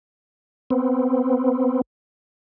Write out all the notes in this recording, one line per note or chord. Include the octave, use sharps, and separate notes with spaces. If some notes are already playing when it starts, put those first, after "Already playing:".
B3 C4